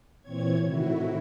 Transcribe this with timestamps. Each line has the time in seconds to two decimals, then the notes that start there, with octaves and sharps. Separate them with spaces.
0.22 A#2 E3 C4 C#5 G#6
0.62 A2 C3 D#3 E4 F#4